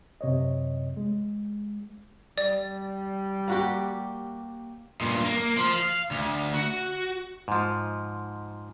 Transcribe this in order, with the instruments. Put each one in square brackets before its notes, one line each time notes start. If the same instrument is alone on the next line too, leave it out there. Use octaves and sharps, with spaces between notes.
[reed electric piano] F#2 C3 C#5 D#5
G#3
[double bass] G3 [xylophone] D5
[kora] A#3 F#4 G4
[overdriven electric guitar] G2 A#2
A#3
F3
F5
D2
F#4
[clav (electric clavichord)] G#2 F3